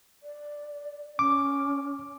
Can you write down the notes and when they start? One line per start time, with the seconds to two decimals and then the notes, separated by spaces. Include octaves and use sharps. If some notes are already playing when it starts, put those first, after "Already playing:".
0.23 D5
1.19 C#4 D6